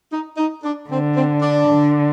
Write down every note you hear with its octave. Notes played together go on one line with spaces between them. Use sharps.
D#4
D#4
D4
D3 C4
C4
D4
D3